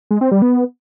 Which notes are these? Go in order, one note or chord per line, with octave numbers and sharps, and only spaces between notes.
G#3
C4
G3
B3